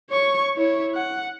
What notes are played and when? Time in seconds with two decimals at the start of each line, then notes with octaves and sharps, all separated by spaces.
0.10 C#5 C#6
0.57 E4 C#5
0.95 F#5